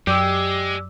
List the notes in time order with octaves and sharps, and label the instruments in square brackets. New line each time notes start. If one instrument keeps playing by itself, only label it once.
[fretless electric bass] F#2 [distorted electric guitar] G#3 [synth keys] G4 [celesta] D5 D6 E6